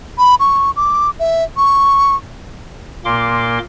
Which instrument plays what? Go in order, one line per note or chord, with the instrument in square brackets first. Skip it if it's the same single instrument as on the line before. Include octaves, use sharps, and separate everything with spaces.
[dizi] B5
C#6
D6
E5
C#6
[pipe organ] A#2 A#3 C6 D6